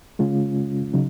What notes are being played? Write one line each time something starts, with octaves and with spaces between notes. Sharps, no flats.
C#3 G#3 C#4 F4
C#3 F#3 D#4